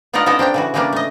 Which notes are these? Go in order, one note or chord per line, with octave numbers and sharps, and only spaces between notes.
B3 D4 D#4 F4 A#4 F#5
B3 C#4 D#4 A4 A#4
C4 D4 G4 G5
C#3 E3 F#4
C#3 E3 G3 A#3 C#4 D4
A3 D#5